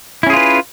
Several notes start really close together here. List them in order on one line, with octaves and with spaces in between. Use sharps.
E4 C#4 G#4 F4 B4